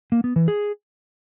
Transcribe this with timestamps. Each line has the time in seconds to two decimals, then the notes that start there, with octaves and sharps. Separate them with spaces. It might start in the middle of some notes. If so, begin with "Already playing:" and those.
0.12 A#3
0.24 B3
0.36 E3
0.48 G#4